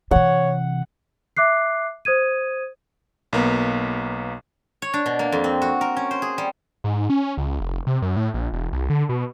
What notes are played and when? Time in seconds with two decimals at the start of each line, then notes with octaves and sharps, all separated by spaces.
0.11 C3 E3 C#5 F#5
1.37 E5 D6 F#6 C7
2.05 C5 D#6 G#6 D#7
3.33 B1 A#3 B3
4.82 C#5
4.94 D4
5.06 B2
5.19 A#3
5.32 F2
5.44 C4
5.62 F#4
5.81 A#4
5.97 C#4
6.11 C5
6.22 G#4
6.38 G3
6.84 G#2
7.10 C#4
7.38 C#2
7.61 F1
7.87 C3
8.02 F#2
8.16 A2
8.34 A#1
8.53 E1
8.73 C2
8.90 D3
9.09 B2